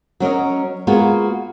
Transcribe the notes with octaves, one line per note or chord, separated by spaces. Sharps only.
F#3 C#4 A#4 D#5
G#3 A#3 B3 F4 F#4 G#4